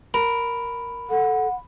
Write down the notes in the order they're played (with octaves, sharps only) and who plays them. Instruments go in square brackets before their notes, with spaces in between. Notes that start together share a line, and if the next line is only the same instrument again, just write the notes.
[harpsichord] A#4 [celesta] B5
[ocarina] A4 [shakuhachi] F#5